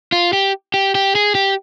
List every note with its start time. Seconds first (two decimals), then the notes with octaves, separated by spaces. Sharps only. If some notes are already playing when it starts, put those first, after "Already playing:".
0.12 F4
0.33 G4
0.74 G4
0.95 G4
1.15 G#4
1.35 G4